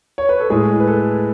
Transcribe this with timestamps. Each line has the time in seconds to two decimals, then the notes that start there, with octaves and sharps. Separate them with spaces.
0.18 C#5
0.29 B4
0.40 A4
0.50 A2 G#3 G#4
0.80 B4
0.87 A4